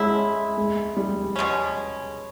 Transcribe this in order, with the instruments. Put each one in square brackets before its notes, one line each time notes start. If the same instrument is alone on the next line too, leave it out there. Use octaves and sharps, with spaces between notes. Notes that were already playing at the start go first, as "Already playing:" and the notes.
Already playing: [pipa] F#3 A3 C#4 E4 [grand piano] G#3
[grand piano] G#3
G3
[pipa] B2 G#3 C#4